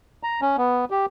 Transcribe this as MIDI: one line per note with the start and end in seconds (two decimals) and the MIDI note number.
0.23 0.41 82
0.42 0.56 61
0.58 0.85 59
0.91 1.06 67